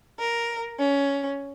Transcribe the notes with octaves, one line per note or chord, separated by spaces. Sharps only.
A#4
C#4